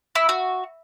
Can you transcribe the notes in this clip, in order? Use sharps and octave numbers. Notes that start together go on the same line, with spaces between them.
E4
F#4